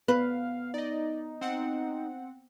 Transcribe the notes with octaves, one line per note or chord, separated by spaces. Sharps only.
B3 B4 F5
D#4 D5 D#5
C4 F#5